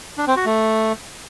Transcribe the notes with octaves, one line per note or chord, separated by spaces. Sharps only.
D4
C4
F#4
A3